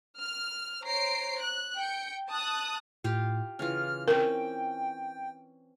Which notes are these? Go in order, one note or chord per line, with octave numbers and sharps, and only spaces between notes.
F6
C5 C#5 A#5 C7 D7
F#6
G5 C#7
A5 D#6 F#6
A2 F4 G4 F5
C#3 E3 F4 F6
C4 C#4 A#4 G5